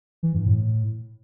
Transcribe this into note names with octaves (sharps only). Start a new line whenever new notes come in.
E3
G2
A2